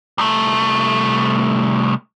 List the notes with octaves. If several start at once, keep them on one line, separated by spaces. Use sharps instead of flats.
C2 A3